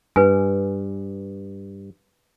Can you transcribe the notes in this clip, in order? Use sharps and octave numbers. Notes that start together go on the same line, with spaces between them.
G2 B4 G#5